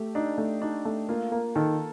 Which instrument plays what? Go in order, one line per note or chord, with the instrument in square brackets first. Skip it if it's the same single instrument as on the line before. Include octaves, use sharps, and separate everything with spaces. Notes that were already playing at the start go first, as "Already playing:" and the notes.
Already playing: [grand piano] A3 [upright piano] G4
[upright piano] D4 [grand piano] D#4
[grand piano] A3
[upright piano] D4 [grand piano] D#4
[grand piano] A3
[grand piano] A#3 [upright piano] F4
[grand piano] A#3
[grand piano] D#3 [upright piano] A4